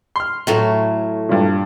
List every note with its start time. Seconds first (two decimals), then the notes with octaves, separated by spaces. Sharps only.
0.16 C6 F6
0.47 A2 F#3 A3
1.29 G2 A#2